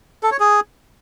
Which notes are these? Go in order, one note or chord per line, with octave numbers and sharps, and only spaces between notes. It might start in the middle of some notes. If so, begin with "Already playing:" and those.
A4
C#5
G#4